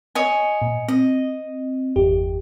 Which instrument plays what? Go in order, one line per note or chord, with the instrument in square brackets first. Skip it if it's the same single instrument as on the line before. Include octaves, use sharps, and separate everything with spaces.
[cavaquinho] C#5 D#5 G#5
[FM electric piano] A#2
[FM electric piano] C4 [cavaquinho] D#5
[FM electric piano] G1 E2 G4